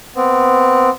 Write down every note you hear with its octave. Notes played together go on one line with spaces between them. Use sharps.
B3 C4